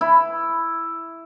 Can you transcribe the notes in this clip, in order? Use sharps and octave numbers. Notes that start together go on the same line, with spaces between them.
E4